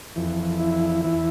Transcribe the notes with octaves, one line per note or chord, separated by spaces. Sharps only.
F2 E3
E4
E2 E3